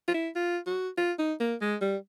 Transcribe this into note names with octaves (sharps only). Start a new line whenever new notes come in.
F4
E4
F4
F#4
F4
D#4
A#3
G#3
G3